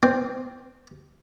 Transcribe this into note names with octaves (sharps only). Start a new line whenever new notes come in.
C4